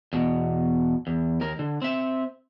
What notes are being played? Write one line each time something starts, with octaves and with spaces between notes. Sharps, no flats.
E2 B2
E2
D#2 A#4
D3
C4 E5